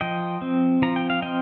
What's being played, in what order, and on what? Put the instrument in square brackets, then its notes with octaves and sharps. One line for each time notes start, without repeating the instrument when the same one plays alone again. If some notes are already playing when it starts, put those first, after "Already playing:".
[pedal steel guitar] F3 D#5 G5
C4
F3 A#5
G5
F5
C4 D#5 G5